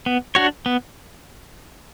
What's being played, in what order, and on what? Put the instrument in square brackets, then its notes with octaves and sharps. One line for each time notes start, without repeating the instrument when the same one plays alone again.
[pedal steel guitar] B3
D4 F#4 C#5
B3